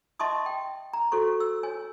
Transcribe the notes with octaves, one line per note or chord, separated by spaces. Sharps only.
D#5 E5 A5 C6 C#6 D#6
G5
A#5
F#4 A4 C5 C#6
E6
C#5 G#5